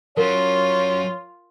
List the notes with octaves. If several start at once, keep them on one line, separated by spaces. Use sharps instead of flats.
F#3 C#4 F4 A#4 C#5